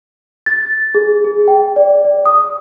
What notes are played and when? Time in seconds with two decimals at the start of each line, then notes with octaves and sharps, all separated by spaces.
0.46 A6
0.95 G#4
1.24 G#4
1.48 G5
1.76 D5
2.05 D5
2.26 D#6